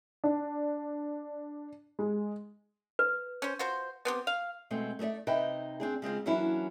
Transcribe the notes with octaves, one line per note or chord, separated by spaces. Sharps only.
D4
G#3
B4
C#4 C5
F4 F#4 C5
B3 C4 G4
F5
B2 G#3 A3 C4
A3 D#4 A#4 D5 E5
C3 D#4 B4 D#5 E5 G5
C4 D4 G#4
C#3 G#3 C4 F4
E3 F#3 A#3 C#4 D4 E4